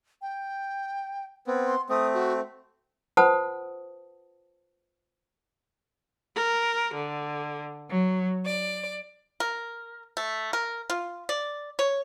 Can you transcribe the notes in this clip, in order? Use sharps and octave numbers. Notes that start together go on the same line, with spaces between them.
G5
B3 C4
C6
A3 C4 D#6
F#4
F4 B4 C5 F#5 A5 D#6
A#4
D3
F#3
D5
A#4
A3
A#4
F4
D5
C#5